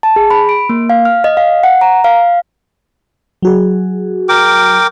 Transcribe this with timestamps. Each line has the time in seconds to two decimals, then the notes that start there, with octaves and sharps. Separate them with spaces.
0.03 A5
0.16 G#4
0.31 B5
0.49 D7
0.69 A#3
0.90 F5
1.05 F6
1.24 D#5
1.37 F5
1.63 F#5
1.81 A#5
2.04 F5
3.42 F#3 F#4 G#4
4.29 A#4 G5 D6